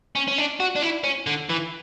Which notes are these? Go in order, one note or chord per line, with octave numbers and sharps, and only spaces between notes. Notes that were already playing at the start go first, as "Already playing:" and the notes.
C#4
C#4
D4
F#4
D4
E4
C#4
D3
E3